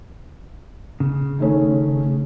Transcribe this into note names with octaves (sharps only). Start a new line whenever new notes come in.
C#3
D#3 A3 C#4